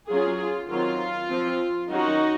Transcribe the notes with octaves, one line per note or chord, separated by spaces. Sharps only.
F#3 C#4 F4 G#4
F4
D#3 F#3 C4 F4
F3 C4
D#3 F#3 C#4 D#4 F#4